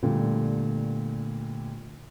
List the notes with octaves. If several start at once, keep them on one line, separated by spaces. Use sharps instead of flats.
A#2 D3 G3 A3 B3